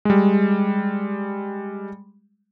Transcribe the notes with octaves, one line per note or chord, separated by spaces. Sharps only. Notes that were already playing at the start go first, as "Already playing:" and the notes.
G3 G#3